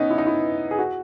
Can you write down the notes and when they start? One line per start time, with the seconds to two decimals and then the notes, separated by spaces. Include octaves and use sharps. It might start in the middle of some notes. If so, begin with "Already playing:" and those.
Already playing: B3 C#4 D#4
0.11 E4
0.18 D#4
0.27 E4
0.71 G#4
0.79 F#4